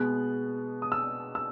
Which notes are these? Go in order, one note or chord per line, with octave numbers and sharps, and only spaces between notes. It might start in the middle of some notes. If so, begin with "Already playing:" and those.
Already playing: B2 G#3 B3 F#6
D#6
E6
E6